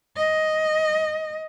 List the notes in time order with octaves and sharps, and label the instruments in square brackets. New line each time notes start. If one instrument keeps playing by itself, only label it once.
[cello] D#5